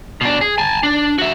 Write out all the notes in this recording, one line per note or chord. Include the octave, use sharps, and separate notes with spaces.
B2 D4
G#4
G#5 A5
D4
F#4 E5